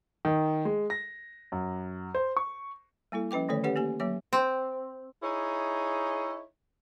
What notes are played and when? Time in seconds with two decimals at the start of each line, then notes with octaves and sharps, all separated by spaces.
0.25 D#3
0.65 G#3
0.90 A#6
1.52 F#2
2.15 C5
2.37 C#6
3.12 G3 A#3 E4 A4
3.31 F3 C#4 B4 G5 D6
3.49 D3 D#3 A3 A4 C#5
3.64 C#4 G4 A4 B4 C#5 F#5
3.76 A#3 G4 G#5
4.00 F#3 A#3 C#5 D6
4.33 C4
5.22 D#4 E4 G#4 C#5